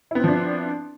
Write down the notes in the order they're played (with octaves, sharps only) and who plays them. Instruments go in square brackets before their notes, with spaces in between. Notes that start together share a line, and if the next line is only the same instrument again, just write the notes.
[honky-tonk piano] E4
B3
C4
F3
D4